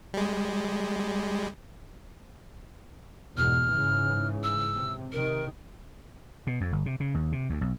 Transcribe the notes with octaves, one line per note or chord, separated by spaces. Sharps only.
G3 G#3
E2 G#2 B2 F6
G#2 C#3 E3
E6
C3
C3 D#3 A#4
B2
F2
G1
C3
C#3
D#2
C3
D2
B1